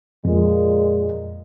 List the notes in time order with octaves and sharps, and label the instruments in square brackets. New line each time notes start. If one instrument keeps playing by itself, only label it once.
[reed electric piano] F2 [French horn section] A#2 G#3